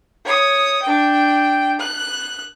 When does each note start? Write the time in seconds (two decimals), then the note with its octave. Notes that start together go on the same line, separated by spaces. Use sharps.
0.25 C#5 D#6
0.82 D4 G5
1.79 F#6